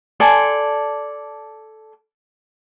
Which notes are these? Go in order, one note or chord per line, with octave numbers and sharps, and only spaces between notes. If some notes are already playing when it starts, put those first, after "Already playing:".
A4 D5 G#5 C6